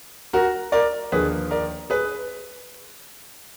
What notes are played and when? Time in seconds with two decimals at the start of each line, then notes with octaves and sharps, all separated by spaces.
0.33 F#4 A#4
0.72 A#4 D5
1.12 D#2 D3 F3 A#3 G#4 B4
1.51 A#4 D5
1.90 G#4 B4